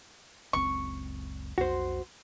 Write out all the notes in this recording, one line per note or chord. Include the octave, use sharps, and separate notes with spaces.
F#1 C#2 C4 C#6
B1 F2 F#4 C5